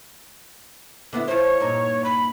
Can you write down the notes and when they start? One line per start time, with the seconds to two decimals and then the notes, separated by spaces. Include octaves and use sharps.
1.13 D3 B3 E4
1.28 F3 C5 C#5
1.60 G2 A#2 D#4
2.04 B5